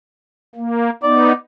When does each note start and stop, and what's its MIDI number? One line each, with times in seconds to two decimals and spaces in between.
0.55 0.90 58
1.03 1.32 59
1.03 1.32 63
1.03 1.32 74